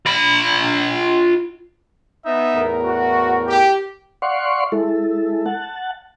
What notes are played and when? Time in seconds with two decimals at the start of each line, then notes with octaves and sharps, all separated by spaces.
0.06 F4 B5
2.25 B3 D#4 E5
2.54 E2 A2 A#4
2.84 F#4
3.47 G4
4.22 D5 F5 F#5 C6 C#6
4.72 G#3 E4 A4
5.46 F#5 A5